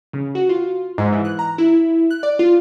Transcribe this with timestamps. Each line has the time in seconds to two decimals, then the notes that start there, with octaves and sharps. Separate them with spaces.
0.13 C#3
0.35 F#4
0.49 F4
0.98 G#2
1.12 E3
1.25 F#6
1.39 A#5
1.58 E4
2.11 F#6
2.23 D5
2.39 F4